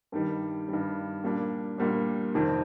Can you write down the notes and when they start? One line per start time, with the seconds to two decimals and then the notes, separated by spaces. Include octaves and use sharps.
0.12 G2 D#3 G3
0.69 G2 D#3 G3
1.24 A#2 G3 A#3 D4
1.78 A#2 G3 A#3 D4
2.34 F2 C3 D#3